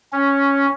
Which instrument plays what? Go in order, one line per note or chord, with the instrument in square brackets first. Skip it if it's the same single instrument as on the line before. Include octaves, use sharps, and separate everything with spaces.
[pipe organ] C#4